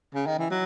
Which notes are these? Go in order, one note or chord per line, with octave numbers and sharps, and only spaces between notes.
C#3
D#3
E3
F#3